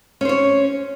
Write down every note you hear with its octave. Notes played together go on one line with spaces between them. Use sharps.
C#4 C5 C#5